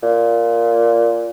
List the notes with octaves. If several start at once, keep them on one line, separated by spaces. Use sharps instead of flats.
A#2